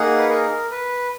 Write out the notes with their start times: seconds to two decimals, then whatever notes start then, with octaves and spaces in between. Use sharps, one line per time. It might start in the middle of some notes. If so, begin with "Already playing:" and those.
Already playing: A#3 D#4 G#4 F#5
0.18 B4
0.29 A#4
0.71 B4